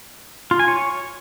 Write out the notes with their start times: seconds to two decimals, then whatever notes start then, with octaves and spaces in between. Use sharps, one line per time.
0.51 F4
0.60 G#5
0.68 C#5